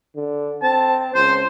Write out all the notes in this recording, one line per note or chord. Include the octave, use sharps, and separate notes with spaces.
D3
C4 A5
C#2 C5